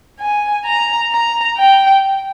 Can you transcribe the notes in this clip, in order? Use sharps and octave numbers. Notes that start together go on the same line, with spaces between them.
G#5
A#5
A#5
G5